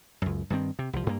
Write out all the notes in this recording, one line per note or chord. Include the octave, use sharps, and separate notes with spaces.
C#2 F#2
G2 D#3 C4
C3
C2 F3
G2 A#3